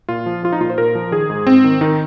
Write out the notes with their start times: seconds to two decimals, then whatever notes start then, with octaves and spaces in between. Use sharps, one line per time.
0.09 A#2 F4
0.26 F3
0.43 F3 F4
0.52 D#4
0.61 A#2 F4
0.70 C5
0.78 A#2 A#4
0.95 F3
1.12 D#3 G#4
1.30 G#2
1.47 G#2 C4
1.64 D#3
1.81 D#3 D#4